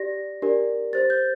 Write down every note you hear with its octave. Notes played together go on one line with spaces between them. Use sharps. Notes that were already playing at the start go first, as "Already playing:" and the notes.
Already playing: G4 D5 A#6
D4 G4 A#4 D5
G4 C5 A6
G6